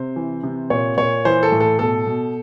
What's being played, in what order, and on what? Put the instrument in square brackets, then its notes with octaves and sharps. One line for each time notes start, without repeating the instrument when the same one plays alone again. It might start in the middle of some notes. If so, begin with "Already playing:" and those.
Already playing: [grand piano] C3 C5
E3
C3
A#2 C#5
A#2 C#5
E3 C5
A4
A2
A4
B2 A4
B2